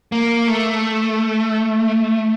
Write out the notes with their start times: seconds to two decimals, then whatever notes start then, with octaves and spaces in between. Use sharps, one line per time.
0.12 A#3
0.48 A3